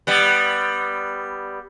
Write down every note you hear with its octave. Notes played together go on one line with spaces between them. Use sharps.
G3 B3